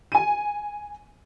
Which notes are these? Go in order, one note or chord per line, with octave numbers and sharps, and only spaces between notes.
G#5 D#7